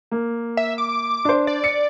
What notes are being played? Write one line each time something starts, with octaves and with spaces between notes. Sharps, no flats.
A#3
E5
D6
D4 C5
D5
C#7